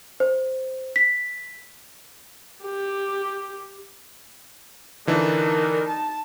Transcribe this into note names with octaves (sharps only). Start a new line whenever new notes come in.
C5
B6
G4
D3 E3 D4 D#4 A#4
A5